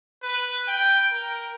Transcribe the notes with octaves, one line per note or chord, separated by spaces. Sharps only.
B4
G5
A#4